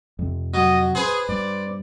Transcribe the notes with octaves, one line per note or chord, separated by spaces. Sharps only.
F2 C3
F#3 D#5
G#4 B4 C5
G2 D5